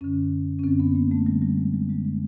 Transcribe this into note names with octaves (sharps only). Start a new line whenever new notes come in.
F#2 D3 C#4
C#4
F#2 D3 C4
B3
A#3
A3
F#2 D3 G3
G3
G#3
G3
F#2 D3 G#3
G#3